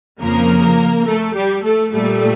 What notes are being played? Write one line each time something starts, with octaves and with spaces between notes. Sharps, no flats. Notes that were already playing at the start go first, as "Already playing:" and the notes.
F2 C#3 F3 A#3 A#4
A3 A4
G3 G4
A3 A4
A#2 G3 A3 A4